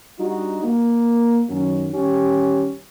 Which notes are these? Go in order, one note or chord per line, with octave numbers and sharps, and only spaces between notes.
G3 D4 D#4 F#4
A#3
F#2 D#3 F#3 C#4
D#3 G3 C#4 G4